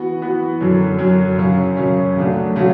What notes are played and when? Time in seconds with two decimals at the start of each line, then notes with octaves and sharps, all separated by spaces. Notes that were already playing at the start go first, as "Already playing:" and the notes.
Already playing: E3 B3 F#4
0.21 E3 B3 F#4
0.60 F#2 D3 F#3
0.99 F#2 D3 F#3
1.38 F#2 C#3 F#3 C#4
1.77 F#2 C#3 F#3 C#4
2.17 C#3 F#3 A3 D4 F#4
2.56 C#3 F#3 A3 D4 F#4